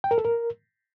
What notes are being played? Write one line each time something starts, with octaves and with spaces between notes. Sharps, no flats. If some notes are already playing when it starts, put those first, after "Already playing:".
G5
A#4
A4
A#4